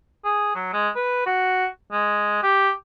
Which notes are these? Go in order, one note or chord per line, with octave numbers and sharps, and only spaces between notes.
G#4
F#3
G#3
B4
F#4
G#3
G4